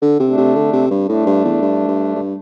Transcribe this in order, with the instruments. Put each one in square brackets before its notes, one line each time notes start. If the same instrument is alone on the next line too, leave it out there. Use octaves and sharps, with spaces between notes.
[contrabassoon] D3
C3
[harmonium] A3 D4
[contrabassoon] C3
D3
C3
G2
[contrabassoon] A2 [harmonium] A3 D4
[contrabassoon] G2
E2
G2
G2
G2